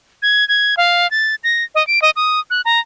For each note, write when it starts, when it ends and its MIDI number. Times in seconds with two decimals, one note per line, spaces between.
0.22 0.47 92
0.48 0.75 92
0.77 1.10 77
1.11 1.35 93
1.44 1.64 94
1.75 1.85 75
1.87 2.02 98
2.02 2.10 75
2.16 2.40 87
2.50 2.61 90
2.65 2.80 82